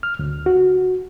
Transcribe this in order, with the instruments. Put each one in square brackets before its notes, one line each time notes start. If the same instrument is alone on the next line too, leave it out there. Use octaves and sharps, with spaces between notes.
[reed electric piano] F6
D2
F#4